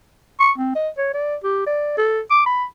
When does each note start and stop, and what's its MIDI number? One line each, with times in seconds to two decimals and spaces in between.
0.40 0.52 85
0.58 0.72 60
0.75 0.89 75
0.98 1.11 73
1.14 1.36 74
1.44 1.62 67
1.66 1.97 74
1.98 2.20 69
2.31 2.42 86
2.46 2.65 83